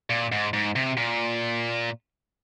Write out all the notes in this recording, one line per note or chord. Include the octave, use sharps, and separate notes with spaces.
A#2
G#2
G#2
C3
A#2